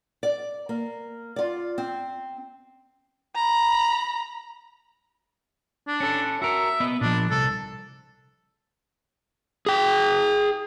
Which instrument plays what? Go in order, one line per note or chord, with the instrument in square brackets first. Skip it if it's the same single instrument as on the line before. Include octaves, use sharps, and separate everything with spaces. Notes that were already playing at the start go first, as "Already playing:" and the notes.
[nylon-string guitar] D5
A#3
F4 D5
C4
[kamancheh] A#5 B5
[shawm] D4
[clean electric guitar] C#4 A4
[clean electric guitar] F#4 A#4 [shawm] E5
[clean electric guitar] B3 B4 D#5
[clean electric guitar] A#2 F3 [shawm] D4
[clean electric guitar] C2 [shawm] A4
[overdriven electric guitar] G#4 G5